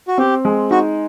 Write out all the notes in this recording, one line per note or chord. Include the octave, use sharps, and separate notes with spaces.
F#4
C4 G4
G#3
D#4 F#4